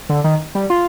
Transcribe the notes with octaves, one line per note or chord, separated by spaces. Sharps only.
D3
D#3
G3
F4